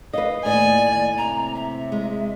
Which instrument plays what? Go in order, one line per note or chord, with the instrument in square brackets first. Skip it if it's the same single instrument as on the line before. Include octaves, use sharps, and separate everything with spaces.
[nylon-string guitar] B4 D#5 [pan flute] F5
[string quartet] D#2 G#5 [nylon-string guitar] A2 D#5 [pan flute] D5
[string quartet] C3 [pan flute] A#5
[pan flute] E5
[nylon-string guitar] G#3